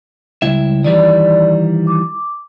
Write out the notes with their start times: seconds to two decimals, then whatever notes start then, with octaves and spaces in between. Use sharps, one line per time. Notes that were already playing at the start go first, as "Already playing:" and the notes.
0.42 C#2 G3 E4 E5
0.84 D#3 E3 G3 D5
1.87 D6